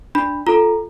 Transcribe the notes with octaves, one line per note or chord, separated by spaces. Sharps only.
D4 B5
F4 A4 A#5